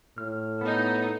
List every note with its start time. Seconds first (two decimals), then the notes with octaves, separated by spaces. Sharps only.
0.18 A2 F6
0.61 B3 D#4 A4